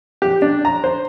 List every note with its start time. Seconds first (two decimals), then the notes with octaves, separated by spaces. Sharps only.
0.22 G4
0.42 D4
0.65 A#5
0.84 C5